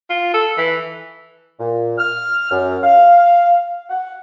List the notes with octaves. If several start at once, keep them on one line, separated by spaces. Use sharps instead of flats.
F4
A4
E3
A#2
F6
F#2
F5
F#5